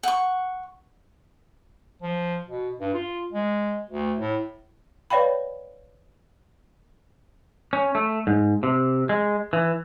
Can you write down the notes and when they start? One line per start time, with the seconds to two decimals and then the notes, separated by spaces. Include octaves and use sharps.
0.03 F#5 C#6
2.02 F3
2.48 B2
2.80 G2
2.94 F4
3.32 G#3
3.90 D2
4.19 A2
5.10 B4 C#5 D5 F5 G5 B5
7.73 C#4
7.95 A3
8.27 G#2
8.63 C3
9.09 G#3
9.53 E3